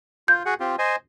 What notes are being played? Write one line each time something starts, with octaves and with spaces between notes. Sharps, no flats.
F4 G6
F#4 G#4 F#5
C4 F4 G4
C5 D#5 G#5